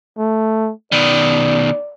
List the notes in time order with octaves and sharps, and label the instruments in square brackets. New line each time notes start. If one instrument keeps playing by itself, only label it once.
[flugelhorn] A3
[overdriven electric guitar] B2 D#3 [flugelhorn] D5